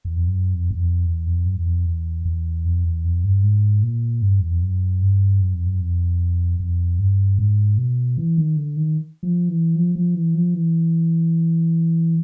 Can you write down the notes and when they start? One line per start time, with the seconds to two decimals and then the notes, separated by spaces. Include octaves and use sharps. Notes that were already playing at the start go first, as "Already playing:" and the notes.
0.05 E2
0.16 F2
0.27 F#2
0.54 F2
0.71 E2
0.80 F2
1.06 E2
1.26 F2
1.46 F#2
1.56 E2
1.66 F2
1.86 E2
2.25 E2
2.65 F2
2.84 E2
3.04 F2
3.24 G2
3.43 G#2
3.83 A#2
4.22 G2
4.40 E2
4.51 F2
4.62 F#2
5.02 G2
5.41 F#2
5.54 F2
5.66 F#2
5.80 F2
6.59 F2
6.99 G2
7.39 G#2
7.78 B2
8.17 E3
8.37 D#3
8.57 D3
8.76 D#3
9.23 F3
9.49 E3
9.75 F3
9.95 F3
10.15 E3
10.35 F3
10.54 E3